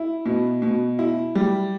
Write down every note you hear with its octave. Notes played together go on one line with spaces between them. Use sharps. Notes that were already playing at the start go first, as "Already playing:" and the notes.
Already playing: E4
B2
B2
E4
G3